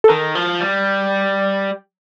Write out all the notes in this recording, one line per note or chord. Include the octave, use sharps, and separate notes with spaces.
A4
D#3 A#4
F3
G3